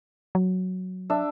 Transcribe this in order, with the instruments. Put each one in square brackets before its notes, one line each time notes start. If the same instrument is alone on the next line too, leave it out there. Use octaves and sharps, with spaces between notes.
[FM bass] F#3
[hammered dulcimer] D4 E5